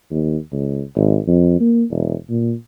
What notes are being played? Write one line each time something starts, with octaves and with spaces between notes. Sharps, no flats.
D#2
C#2
G#1
F2
A#3
E1
A#2